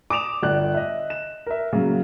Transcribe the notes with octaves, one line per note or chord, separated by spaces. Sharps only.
D6 D#6 D7 E7 F7
G1 D5 F#6
D#5 E5
E7
A#4 E5
C#3 F#3 A#3